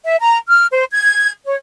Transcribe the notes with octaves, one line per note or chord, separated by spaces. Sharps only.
E5
A#5
F6
C5
G#6
C#5